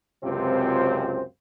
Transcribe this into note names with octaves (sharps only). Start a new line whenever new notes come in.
C#2 F#2 C3 C4 F4 C5